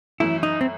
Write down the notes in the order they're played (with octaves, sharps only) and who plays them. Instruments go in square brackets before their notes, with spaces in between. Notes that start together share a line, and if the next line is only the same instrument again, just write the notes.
[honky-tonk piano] F#2 E3 A3 [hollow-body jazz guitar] E4
[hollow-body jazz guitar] D#4
C4